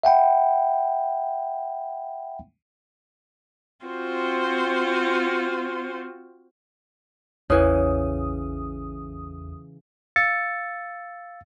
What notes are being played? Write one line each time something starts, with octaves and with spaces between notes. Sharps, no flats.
E5 F#5 G5 B5
C4 F4 F#4 C5
A1 E2 C#3 E3 D#6
F5 E6 A6 C#7